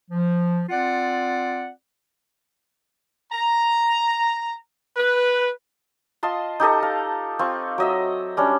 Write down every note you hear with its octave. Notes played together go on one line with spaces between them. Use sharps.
F3
C4 F4 D5 F#5
A#5
B4
F4 D#5 A5 C6
D#4 G4 A4 D#5
F5
C4 F4 C#6
F#3 D#5 E5
G3 C#4 D4